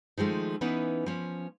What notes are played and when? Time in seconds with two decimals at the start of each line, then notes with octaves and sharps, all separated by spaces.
0.18 D#3 F3 G#3 A3
0.61 E3 B3 C#4 D#4 E4
1.06 F3 C#4